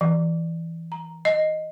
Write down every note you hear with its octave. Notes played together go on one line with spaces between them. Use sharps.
E3
A#5
D#5